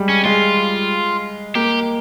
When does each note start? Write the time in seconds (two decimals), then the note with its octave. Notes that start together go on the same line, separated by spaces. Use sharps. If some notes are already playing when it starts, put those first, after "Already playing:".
Already playing: G3 G#3
0.09 C#4
0.25 G#3 F4
1.55 A#3 G4